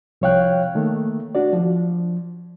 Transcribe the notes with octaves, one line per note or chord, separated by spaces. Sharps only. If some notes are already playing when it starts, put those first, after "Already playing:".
C2 F3 C#5 F5 G5 F#6
D#3 A3 A#3
D4 F#4 D5
F3